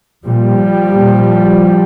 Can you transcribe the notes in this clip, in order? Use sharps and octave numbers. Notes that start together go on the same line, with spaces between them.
A#2 F3 G3
A#2